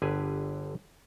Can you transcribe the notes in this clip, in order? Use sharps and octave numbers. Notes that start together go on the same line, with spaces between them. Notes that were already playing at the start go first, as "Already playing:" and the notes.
G1 D3 G4 G#4 B4 G#5